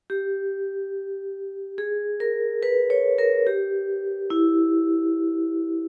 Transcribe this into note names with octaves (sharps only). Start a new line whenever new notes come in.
G4
G#4
A#4
B4
C#5
A#4
G4
E4